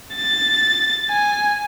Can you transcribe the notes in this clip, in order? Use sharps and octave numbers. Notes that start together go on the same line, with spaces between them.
A6
G#5